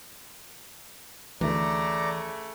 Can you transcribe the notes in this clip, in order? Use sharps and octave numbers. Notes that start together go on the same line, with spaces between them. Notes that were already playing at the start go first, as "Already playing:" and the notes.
D2 C#3 E3 A3 D5 A#5